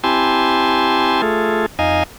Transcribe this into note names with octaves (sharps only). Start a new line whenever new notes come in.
C4 E4 G4 G#5 A5 C6
A3 F4 G#4 A4
F2 D#4 D#5 F5 G#5